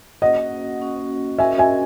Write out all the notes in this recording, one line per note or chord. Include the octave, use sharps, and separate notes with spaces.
A#3 C#4 F#4 D#5 F#5
A#3 C#4 F#4
C#4 F#4 A#4 D#5 E5 G#5
E5 G#5